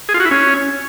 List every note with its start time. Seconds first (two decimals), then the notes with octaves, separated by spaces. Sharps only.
0.09 G#4
0.14 F4
0.20 F#4
0.25 E4
0.31 C#4